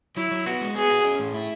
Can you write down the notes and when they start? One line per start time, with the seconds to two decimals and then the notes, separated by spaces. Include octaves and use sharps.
0.17 F#3 E4
0.31 F#3
0.46 B3 F#4
0.61 G#3
0.75 B3 G#4
0.90 F#4
1.04 C#4
1.19 A2
1.34 E4